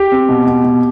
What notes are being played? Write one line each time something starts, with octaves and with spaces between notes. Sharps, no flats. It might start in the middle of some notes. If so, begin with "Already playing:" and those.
Already playing: G4
C4
B2
B2
B2